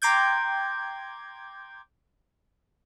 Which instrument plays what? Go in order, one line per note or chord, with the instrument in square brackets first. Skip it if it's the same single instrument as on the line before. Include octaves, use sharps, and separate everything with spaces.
[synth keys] G5 A#5 C6 D6 G6 G#6